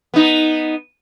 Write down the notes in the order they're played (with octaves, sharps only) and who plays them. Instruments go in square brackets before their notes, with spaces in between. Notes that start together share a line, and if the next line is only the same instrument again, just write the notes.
[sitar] B3 D#4